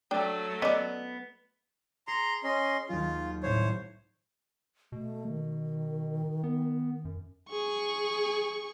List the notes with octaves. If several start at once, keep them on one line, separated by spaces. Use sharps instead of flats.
F#3 A3 D4 G5
B3 C#4 D5 D#5
G#4 A#5 C6 B6 C#7
C#4 D#5 C6
D#2 F#3 F4
C2 A2 C5 C#5
B2 A3
D#3
B3
F#2
G#4 C#6